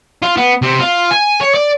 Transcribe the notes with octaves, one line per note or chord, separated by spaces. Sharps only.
F4
B3
C3
F4
G#5
C#5
D5